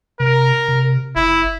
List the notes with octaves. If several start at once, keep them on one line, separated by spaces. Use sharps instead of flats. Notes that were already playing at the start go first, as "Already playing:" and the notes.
C3 A#4
C3
F#1 E4